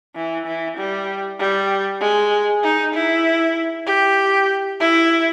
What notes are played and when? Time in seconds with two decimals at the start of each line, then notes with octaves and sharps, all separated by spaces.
0.16 E3
0.46 E3
0.77 G3
1.40 G3
2.01 G#3
2.63 D#4
2.94 E4
3.87 G4
4.80 E4